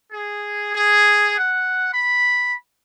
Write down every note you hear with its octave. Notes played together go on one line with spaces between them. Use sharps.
G#4
G#4
F#5
B5